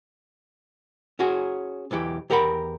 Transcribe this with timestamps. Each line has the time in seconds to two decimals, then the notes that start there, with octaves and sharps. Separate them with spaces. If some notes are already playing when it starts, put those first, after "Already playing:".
1.19 C#4 F#4 G#4
1.91 B1 E2 E3 G4
2.30 E2 G4 A#4 F#5 B5